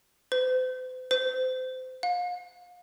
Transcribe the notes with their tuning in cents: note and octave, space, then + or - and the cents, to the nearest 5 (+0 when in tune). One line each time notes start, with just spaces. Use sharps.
C5 -45
C5 -30
F5 +35